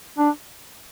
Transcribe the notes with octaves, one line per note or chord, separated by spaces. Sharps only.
D4